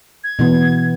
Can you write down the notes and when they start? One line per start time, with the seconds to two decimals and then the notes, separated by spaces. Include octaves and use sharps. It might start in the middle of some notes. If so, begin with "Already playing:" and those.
0.24 G#6
0.39 B2 E3 B3